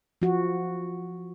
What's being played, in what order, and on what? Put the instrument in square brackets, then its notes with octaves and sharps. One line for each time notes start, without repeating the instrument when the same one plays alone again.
[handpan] F3 F#4